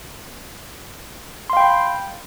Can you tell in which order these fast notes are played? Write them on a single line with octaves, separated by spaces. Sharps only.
C6 F5 G5 B5